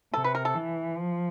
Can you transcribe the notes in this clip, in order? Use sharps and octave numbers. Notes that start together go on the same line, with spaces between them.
C3 A4
B4
A#4
A4
E3
F3